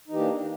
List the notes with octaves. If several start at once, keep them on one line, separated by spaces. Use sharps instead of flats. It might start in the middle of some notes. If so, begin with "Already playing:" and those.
E3 A#3 D4 D#4 G4